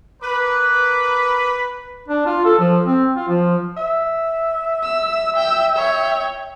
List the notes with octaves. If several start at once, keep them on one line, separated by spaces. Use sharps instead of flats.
A#4 B4 D6
D4
F4
A4
F3
C4
F4
F3
E5
E6
G5 E6
C#5 G5